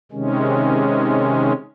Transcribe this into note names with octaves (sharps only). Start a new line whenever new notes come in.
C3 D#3 G#3 C#4